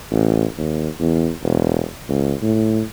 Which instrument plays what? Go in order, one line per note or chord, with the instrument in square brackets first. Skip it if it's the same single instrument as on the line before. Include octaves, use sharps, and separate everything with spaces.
[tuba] A1
D#2
E2
E1
C#2
A2